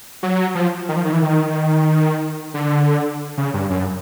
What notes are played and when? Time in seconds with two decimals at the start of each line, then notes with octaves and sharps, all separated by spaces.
0.23 F#3
0.55 F3
0.89 D#3
0.96 F3
1.05 D#3
1.13 E3
1.22 D#3
2.54 D3
3.37 C#3
3.54 G2
3.70 F#2